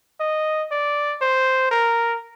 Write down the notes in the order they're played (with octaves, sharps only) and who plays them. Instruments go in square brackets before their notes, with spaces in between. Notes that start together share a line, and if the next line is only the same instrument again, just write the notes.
[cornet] D#5
D5
C5
A#4